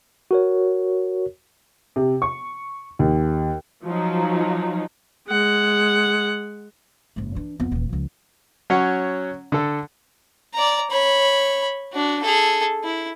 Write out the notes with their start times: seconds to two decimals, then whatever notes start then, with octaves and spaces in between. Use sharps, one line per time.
0.31 F#4 A#4 C#5
1.96 C3
2.22 C#6
2.99 D#2
3.84 F3 F#3 D#4
5.28 G#3 F#5
7.16 F#1 G#2
7.35 E3 D4
7.60 F2 B3
7.72 D#1 E3
7.89 C#2 F3
8.70 F#3 C#4 F#5
9.52 D3 A4
10.54 D5 A#5
10.90 C#5 B5
11.93 D4 F#4
12.22 G#4 A4
12.84 E4